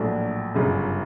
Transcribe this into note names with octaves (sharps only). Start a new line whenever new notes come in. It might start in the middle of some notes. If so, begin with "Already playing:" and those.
Already playing: A#1 A2 F#3 A3 D4
G1 F#2 C#3